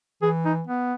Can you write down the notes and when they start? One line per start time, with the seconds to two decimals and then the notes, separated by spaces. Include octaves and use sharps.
0.22 E3 G#4
0.45 D#4
0.67 B3